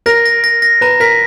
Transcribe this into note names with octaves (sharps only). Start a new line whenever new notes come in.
A#4 A#6
A#6
A#6
A#6
B4 A#5
A#4 B6